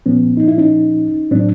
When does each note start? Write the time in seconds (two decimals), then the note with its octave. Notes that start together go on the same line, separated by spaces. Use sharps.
0.06 A#2 F3 B3 C#4
0.37 D#4
0.48 E4
0.58 C#4 D#4
1.31 A2 F#3 C4 D4